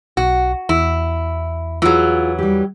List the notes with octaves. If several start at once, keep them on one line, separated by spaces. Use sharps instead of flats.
B1 F#4
E2 E4
E3 F#3 F4 G#4
G3 G4